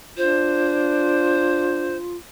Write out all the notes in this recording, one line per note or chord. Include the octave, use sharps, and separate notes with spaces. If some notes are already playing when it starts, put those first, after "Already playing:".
D4 F4 C5